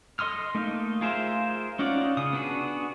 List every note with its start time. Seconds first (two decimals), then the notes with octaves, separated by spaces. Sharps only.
0.19 A4 D#5 C6 D#6 F6
0.55 A3 A#3 D#4
1.01 F4 G#4 A#4 C5 E5
1.79 C#4 D#4 F4 D5 F#5
2.17 C#3 D#6
2.33 B3 D4 F#4 G#4